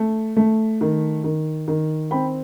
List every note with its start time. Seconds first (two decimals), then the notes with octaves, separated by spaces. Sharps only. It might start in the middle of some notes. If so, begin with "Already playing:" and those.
Already playing: A3
0.36 A3
0.81 D#3
1.24 D#3
1.68 D#3
2.11 C4 G5 B5